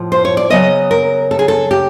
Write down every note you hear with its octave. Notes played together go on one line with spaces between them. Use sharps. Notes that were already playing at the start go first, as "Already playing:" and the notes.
Already playing: A2 F3
C5
C#5
D5
C#3 F#3 B3 D#5
A#4
A4
G#4
A4
G4